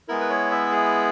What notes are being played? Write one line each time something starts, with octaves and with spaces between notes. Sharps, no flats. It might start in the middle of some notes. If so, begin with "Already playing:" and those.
G#3 B3 E4 A#4
B4
C#5
E5
G#4